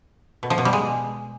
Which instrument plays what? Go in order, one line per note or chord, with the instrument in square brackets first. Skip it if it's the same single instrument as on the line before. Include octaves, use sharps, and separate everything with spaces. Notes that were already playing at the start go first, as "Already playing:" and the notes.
[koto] B2
F3
B2
G3
G#3